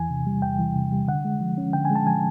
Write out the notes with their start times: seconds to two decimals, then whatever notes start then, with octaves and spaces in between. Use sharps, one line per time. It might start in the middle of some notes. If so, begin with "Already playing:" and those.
Already playing: E2 E3 G#5
0.10 C3
0.26 G3
0.42 E2 G5
0.59 E3
0.75 C3
0.92 G3
1.08 D3 F#5
1.25 G#3
1.41 F3
1.58 C#4
1.73 D3 G5
1.85 G#5
1.90 G#3
1.95 A5
2.07 F3 G#5